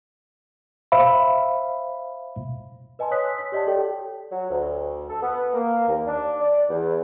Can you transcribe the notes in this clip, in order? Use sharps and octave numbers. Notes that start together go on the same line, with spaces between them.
C5 E5 F5 B5
B4 D#5 G#5 A5 C6
C#5 C6 D#6 F#6 B6
E6
B6
G4 D5 D#5 F#5 A5
F#4 G4 A4 C#5 D5 G5
F#3
D2
A4
B3
A#3
D#2
D4
D5
E2